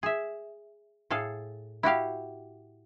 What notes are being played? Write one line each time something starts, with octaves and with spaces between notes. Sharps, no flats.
G#4 E5
A2 G#4 A4 F5
E4 F#4 G4 F5